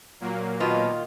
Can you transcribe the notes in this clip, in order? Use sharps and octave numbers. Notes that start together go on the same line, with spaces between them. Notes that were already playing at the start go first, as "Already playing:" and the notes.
A#2 F#3 A#3
B2 D#3 F4